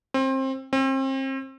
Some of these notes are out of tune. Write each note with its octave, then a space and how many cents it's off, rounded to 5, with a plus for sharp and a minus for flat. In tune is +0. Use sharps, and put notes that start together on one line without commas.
C4 +25
C4 +35